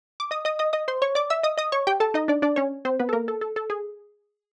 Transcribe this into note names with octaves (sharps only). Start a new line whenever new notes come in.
D6
D#5 D#6
D#5 D#6
D#5 D#6
D#5 D#6
C5 C6
C#5 C#6
D5 D6
E5 E6
D#5 D#6
D#5 D#6
C#5 C#6
G4 G5
A4 A5
D#4 D#5
D4 D5
D4 D5
C#4 C#5
C4 C5
B3 B4
A4
A#3 A#4
A4
A4
A4
G#4